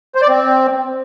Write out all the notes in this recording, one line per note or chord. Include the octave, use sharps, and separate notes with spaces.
C5
D5
C4